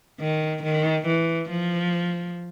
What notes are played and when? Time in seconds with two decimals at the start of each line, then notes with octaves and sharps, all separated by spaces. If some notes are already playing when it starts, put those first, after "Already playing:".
0.20 D#3
0.63 D#3
1.06 E3
1.50 F3